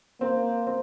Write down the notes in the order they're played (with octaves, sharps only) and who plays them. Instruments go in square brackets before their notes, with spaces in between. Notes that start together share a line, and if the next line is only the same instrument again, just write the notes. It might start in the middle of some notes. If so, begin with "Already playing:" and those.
[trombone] A#3 [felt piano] C4
[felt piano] C4